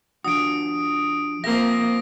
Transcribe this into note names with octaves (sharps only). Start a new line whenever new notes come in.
F3 D4 F#4 D#6 D7
F3 A#3 C4 E5 A#6